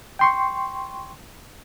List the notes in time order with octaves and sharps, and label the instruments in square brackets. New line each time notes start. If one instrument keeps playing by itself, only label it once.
[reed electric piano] G5 C6 C#6